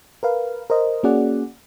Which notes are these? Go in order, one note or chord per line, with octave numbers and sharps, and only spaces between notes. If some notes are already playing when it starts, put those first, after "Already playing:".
A#4 B4 F5
A#4 C5 D#5
A#3 C#4 F#4 G#4 D5 F#5